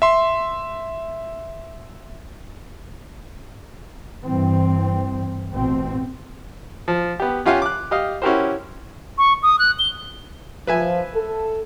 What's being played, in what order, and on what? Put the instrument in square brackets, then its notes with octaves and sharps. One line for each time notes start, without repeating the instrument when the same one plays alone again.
[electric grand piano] E5 C6
[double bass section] G2 E3 C4
A1 B2 C4
[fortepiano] F3
B3 G4
C#4 F4 G4 F5 F#5 G#5
D6 F#6
G4 D#5 F5
C#4 E4 F#4 G4 A#4 C5
[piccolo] C#6
D#6
F#6
G7
[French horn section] F3 [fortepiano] B4 E5 G#5
[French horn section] A4